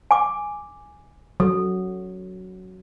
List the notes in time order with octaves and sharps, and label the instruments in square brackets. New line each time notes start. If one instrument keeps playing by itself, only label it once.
[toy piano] G#5 D6
[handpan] F#3 [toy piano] A4